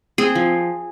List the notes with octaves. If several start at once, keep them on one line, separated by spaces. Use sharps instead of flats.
C4 G#4
F3